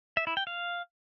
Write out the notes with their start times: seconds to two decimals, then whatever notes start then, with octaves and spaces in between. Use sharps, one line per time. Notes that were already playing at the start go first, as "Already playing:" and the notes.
0.17 E5
0.27 E4
0.37 G5
0.47 F5